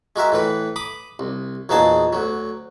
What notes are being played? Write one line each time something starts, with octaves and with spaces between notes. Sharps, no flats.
G#3 F#4 A#4 E5
A2 E3 B4
B5 D6 D#6
C2
E2 A#2 F#3 D#4 G#4 A5
D2 F#3